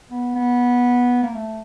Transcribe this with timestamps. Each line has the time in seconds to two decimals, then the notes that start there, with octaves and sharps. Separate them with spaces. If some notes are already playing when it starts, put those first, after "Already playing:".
0.11 B3
0.35 B3
1.23 A#3
1.34 A3